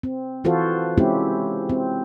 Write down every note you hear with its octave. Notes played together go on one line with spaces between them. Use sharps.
C4
E3 F4 F#4 A4 C5
G#3 C4 C#4 E4 F#4 G4
C4